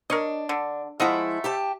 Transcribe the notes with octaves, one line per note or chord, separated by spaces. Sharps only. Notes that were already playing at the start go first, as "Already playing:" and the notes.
D4 A#4 C#5 D#5
D3
F3 G#3 A3 E4 D#5 F#5
G4 G5 A5